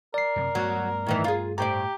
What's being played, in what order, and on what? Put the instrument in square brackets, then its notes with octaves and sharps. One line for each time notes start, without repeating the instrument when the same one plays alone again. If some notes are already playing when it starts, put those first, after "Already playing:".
[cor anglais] A#4 [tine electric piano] D5 C7
[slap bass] F#2 C3
[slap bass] G2 A3 B3 [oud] F#3
[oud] A2 D#3 E3
F4 G#4
[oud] A2 C5 D5 [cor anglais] G4 [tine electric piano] A#5